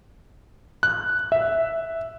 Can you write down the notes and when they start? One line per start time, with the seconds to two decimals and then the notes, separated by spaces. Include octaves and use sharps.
0.83 F#6
1.32 E5